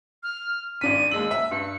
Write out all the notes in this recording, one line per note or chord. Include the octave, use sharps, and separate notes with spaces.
F6
G#1 D4 B6 D#7
D#2 G#3 E6 F#7
E5
G2 C#7